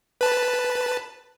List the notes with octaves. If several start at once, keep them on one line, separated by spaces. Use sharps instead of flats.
B4 A5